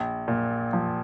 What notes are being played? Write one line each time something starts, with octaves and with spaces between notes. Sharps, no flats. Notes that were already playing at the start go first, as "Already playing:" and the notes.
Already playing: A#1
A#2
F3